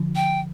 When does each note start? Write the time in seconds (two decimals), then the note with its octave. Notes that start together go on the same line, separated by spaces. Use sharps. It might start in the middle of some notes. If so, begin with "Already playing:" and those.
Already playing: D3 F3
0.16 G5